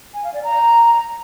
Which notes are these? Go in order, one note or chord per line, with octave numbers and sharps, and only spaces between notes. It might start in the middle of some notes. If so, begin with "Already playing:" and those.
G#5
F5
D5
A#5